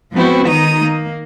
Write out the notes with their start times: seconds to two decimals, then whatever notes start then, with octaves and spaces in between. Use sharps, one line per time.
0.13 F3 G#3 B3 C4 E4 F#4
0.47 D#3 D#4 A#5 D#6
0.80 A#3